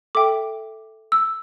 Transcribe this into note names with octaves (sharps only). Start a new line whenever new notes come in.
A4 E5 G5 D6
E6